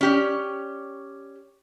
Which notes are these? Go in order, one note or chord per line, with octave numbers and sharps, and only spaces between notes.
C#4 G4 D5